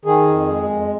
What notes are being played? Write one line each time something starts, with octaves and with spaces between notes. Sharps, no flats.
D#3 G#4
F2
G#3
F2